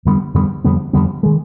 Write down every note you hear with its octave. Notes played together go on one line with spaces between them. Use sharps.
F2 D3 G3 B3
F2 D3 G3 B3
F2 D3 G3 B3
F2 D3 G3 B3
D#3 G#3